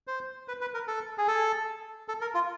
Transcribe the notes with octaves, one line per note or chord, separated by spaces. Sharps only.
C5
B4
B4
A#4
A4
G#4
A4
A4
A#4
F4